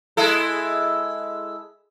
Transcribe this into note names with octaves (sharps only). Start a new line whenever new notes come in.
G#3 E4 A4